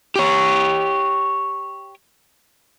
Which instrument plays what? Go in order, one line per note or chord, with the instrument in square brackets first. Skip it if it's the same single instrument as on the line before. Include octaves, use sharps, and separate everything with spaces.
[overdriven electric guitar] G4 C#5